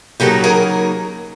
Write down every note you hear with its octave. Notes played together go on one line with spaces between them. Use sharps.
C#3 F#3 A#3 D#4 G4 A4
G#4 A#4